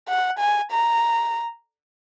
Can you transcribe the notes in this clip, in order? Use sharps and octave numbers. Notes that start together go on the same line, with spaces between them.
F#5
G#5
A#5